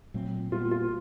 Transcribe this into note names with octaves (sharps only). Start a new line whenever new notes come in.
A#2 F#3 A3 C4
A#2 G3 B3 F4
F4